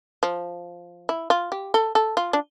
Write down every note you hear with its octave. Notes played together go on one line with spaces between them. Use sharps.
F3
E4
F4
G4
A4
A4
F4
D4